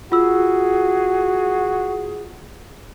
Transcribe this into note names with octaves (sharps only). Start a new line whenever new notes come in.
F4 F#4 G#4 E6